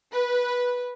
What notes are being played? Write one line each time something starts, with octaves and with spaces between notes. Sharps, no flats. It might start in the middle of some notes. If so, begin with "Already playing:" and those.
B4